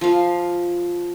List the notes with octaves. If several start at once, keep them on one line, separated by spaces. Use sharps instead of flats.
F3 F5